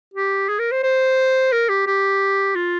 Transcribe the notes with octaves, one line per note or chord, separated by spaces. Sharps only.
G4
G#4
A#4
C5
C5
A#4
G4
G4
F4